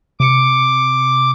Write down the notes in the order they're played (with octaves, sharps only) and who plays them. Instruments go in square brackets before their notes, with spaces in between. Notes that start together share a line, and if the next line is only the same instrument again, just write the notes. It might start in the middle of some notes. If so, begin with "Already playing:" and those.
[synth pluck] C3 C#7 [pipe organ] D6